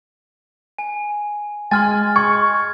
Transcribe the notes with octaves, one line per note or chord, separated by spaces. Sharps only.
G#5
G#3 G#5 C6 F6 A6
C6 C#6 G#6